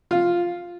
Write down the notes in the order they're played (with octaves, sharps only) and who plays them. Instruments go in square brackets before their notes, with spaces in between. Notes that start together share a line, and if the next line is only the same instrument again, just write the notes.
[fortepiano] F4